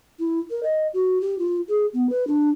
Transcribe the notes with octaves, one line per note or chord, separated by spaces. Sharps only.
E4
A#4
D#5
F#4
G4
F4
G#4
B3
B4
D4